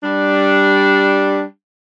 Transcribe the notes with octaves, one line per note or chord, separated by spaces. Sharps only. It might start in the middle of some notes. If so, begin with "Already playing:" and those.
G3 D4